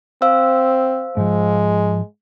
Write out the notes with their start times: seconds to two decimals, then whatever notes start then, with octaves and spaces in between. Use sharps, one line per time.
0.22 C4 C5 F5 E6
1.17 G#2 F3 G#3